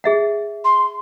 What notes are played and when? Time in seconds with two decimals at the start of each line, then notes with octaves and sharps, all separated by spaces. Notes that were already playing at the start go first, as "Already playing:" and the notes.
0.04 G#4 E5 F#5
0.65 C6